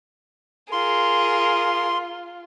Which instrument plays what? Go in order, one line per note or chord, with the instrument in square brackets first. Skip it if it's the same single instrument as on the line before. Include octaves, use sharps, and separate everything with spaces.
[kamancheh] F4 [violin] G#4 A#4 [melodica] C6